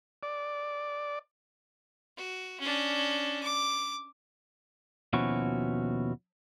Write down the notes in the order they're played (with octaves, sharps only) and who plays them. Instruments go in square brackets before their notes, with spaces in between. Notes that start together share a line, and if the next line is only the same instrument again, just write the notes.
[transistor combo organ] D5
[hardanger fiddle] F#4
C#4 D4
D6
[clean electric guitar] D#2 B2 F3 C#4 E4 F#4